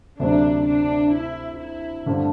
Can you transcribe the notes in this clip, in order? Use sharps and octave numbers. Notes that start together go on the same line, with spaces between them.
D2 C3 F#3 A3 C4 D4
D4
E4
E4
G2 D3 A3 C4 G4